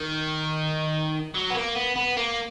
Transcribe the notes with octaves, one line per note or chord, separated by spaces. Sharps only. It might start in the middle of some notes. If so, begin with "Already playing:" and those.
Already playing: D#3
F#3
B3
A#3
B3
B3
A#3